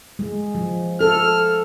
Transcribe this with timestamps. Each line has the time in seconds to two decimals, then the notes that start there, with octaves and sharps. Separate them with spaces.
0.19 G#3
0.55 F3
1.01 A4 F6